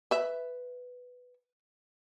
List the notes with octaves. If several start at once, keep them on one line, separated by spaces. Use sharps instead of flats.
B4 E5